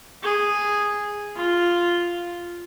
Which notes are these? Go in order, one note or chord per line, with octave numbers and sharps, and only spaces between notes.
G#4
F4